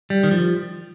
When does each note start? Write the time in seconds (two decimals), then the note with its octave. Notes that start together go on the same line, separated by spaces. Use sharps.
0.10 G3
0.23 D#3
0.31 F3